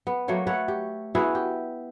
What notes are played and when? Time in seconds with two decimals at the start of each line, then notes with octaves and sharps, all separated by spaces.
0.07 B3
0.28 F#3 A3 A#3 C#5
0.47 A4 B4 C#5 F#5
0.68 G4
1.15 B3 E4 F#4 G#4
1.35 G4